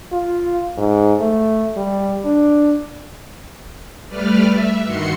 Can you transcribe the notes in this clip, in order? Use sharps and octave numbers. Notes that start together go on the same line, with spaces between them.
F4
G#2
A3
G3
D4
G3 A3 B4 D5 F6
E5
G2 D#3 F#4 C6 C#7